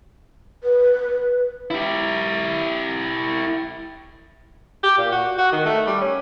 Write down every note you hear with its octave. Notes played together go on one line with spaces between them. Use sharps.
B4
E4 G4
G4
A#2
F#4
F#4
D#3
A3
G3
C#4